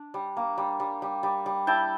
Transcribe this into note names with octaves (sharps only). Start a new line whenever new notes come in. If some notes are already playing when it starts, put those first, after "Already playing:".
Already playing: D4
G3
A#3
G3
G3
G3
G3
G3
E4 G5 A5